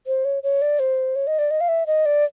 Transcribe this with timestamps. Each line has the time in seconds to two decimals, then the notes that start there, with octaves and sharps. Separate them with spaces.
0.07 C5
0.25 C#5
0.43 C#5
0.62 D5
0.79 C5
1.16 C#5
1.27 D#5
1.39 D5
1.51 D#5
1.61 F5
1.69 E5
1.87 D#5
2.06 D5